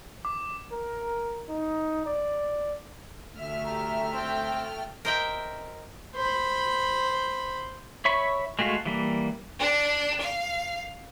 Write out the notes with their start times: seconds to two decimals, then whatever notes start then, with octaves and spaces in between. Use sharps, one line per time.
0.25 D6
0.72 A#4
1.49 D#4
2.06 D5
3.34 D2 A3 E5 F6
3.65 G4 A#5
4.13 C4 G5 A5
5.05 A#4 C5 D#5 E5 G5
6.15 C5 B5
8.05 C#5 E5 B5 C#6
8.59 G#3 A3 F#4 F5
8.86 E3 G3 A#3
9.60 D4
10.20 F5